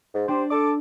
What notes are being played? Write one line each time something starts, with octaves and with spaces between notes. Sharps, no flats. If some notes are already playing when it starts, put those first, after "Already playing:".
G#2
D4 G4 C5
A4 D6